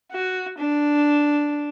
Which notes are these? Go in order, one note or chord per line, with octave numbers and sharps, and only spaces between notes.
F#4
D4